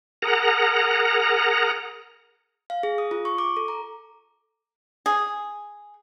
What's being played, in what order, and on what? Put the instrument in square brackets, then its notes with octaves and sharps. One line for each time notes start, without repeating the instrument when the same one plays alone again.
[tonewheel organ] G#4 A#4 F#5 A#5
[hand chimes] F5
G#4
D#6
F4
C#6
D6
A4
A#5
[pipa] G#4